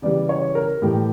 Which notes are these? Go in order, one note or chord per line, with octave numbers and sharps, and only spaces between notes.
C#3 E3 G3 D5
C#5
A#4
A2 E3 G3 G4